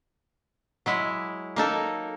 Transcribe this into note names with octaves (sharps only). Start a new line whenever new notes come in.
F#3 G#3 E4
A#3 D#4 A4 A#4